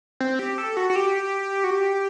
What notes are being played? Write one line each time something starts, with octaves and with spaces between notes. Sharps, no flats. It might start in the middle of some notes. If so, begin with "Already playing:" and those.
C4
G4
A4
F#4
F#4
G4
F#4
G4